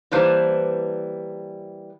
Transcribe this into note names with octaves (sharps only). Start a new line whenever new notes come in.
E3 G3 A#3 B4 C5 A5